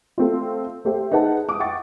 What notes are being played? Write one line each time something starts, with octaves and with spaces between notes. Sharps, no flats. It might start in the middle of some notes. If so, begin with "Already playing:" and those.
A3 C4 F4
A3 G4 C5 E5
D#4 G#4 B4 F#5 A5
D6 D#6
F#5 G5 C#6 D6 A6